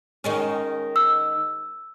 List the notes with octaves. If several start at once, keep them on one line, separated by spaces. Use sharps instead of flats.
D#3 G#3 C#4
E6